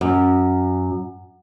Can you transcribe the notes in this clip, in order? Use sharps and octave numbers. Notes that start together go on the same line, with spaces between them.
F#2